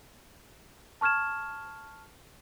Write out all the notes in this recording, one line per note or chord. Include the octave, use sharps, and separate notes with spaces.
A5 C#6 F6 G#6 E7